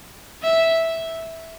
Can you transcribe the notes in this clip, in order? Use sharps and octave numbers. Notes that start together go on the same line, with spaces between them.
E5